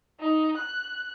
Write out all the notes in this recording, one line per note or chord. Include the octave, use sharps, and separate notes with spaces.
D#4
F#6